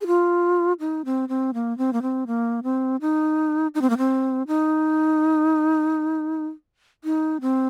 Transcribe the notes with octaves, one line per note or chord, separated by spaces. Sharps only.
G#4
F4
D#4
C4
C4
A#3
C4
A#3
C4
A#3
C4
D#4
D#4
C4
A#3
C4
D#4
D#4
C4